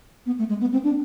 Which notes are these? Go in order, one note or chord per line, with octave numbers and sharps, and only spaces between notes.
B3
A3
G#3
B3
C4
D4